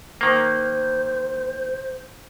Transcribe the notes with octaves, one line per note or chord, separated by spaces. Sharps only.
D#3 A#3 C5